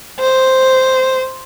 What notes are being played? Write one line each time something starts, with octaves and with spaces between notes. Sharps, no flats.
C5